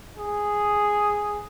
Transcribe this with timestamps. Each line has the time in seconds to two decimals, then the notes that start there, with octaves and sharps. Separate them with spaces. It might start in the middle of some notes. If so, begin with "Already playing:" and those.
0.18 G#4